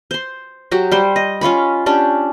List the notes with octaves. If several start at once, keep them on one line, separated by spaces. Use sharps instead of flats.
C5 C6
F#3 F#4 G4
G3 C5 C6
D#5
C#4 F4 C#5 B5
C#4 D4 G4